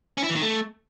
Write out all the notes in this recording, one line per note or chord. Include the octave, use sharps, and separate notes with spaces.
C#4
E4
E3
D#3
A3